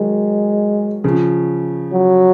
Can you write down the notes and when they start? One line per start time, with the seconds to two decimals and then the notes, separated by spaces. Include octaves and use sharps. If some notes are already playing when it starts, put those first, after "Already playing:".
Already playing: D#3 F#3 G#3
1.04 C#3 F3
1.93 F#3